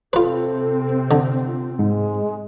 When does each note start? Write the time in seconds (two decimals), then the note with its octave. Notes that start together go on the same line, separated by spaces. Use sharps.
0.13 C3 C4 F4 A4 B4
1.11 D3
1.46 F4
1.79 G#2 G#3